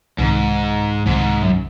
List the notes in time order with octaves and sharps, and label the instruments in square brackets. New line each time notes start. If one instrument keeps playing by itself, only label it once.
[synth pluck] C2 C3 D#3 [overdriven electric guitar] G#2
[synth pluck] C2 C3 D#3 [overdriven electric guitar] G#2
[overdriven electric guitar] F#2